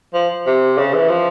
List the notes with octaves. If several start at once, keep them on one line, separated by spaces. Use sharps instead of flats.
F3
C3
C#3
E3
F3